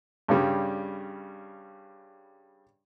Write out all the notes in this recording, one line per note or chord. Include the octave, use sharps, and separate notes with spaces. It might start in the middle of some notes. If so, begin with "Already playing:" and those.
G2 C#3 G3